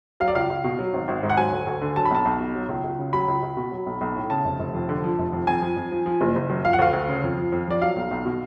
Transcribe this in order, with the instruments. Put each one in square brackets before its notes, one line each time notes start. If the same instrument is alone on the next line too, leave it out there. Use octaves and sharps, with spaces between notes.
[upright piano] F#3 F5
D5
C#2 F5
C#2
B2
F#3
G#1
G#1
G#2
F#5
F#3 G#5
D2
D2
D3
F#3 A5
B5
B1 A5
B1
B2
F#3
C#2
C#2
C#3
F#3 B5
C#2
C#2
B2
F#3
B1
B1
A2
C#3 A5
F1
F1
F2
D3
F3
F1
F2
F2 G#5
F3
F2
F3
F3
F#1
F#1
F#2
F3 F5
F#5
D2 F5
D2
C#3
F2
F3
F2
F3 D5
F#3 F5
B1
B1
B2